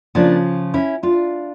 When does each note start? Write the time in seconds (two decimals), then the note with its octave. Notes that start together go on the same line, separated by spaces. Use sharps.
0.15 C#3 F3 A#3 D4
0.74 C#4 E4
1.03 D4 F4